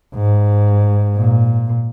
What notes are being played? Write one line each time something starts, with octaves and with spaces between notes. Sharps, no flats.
G#2
A#2